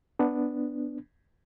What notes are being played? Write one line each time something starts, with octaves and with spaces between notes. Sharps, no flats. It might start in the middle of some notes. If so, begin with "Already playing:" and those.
B3 D4